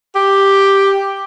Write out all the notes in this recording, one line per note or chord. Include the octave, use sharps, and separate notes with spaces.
G4